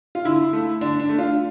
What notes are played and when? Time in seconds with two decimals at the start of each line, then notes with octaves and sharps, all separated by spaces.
0.15 F4
0.25 D3 E4
0.53 A3
0.81 D3 D4
0.99 D4
1.09 A3
1.18 D4 F4